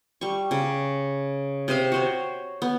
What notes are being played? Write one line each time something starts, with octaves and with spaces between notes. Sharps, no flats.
G3 C#6
C#3
C3 C5 D#5 F5
F#4 C5 C#5
B3